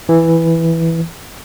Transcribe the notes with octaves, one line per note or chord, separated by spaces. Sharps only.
E3